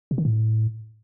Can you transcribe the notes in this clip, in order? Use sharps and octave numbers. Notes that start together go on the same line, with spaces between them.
C3
D#3
A2